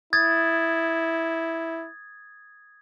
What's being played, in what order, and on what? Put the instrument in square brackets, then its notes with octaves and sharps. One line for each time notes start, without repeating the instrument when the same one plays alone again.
[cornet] E4 [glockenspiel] D#6 G#6 A6